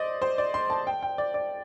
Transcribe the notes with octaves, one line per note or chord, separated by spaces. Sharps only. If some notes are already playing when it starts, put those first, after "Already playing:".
Already playing: C5 D5 D#5
C5
D5
C6
A5
G5
G5
D5
D5